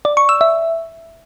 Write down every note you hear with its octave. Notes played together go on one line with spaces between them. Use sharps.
D5
C#6
E6
E5